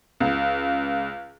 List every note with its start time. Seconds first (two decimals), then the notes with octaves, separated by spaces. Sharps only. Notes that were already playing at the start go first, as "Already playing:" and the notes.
0.20 C#2